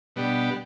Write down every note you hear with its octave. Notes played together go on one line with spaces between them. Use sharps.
B2 G3 B3 D4 G4